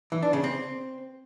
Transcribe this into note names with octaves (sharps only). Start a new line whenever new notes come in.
E3
D4
C#3
C4